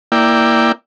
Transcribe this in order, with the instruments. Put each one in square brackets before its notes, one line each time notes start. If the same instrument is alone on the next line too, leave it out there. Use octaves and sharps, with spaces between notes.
[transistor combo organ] A#3 E4 D5 G5